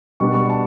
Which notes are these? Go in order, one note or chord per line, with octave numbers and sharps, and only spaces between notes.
B2 G3 B3 D4 C#6
C#6
A5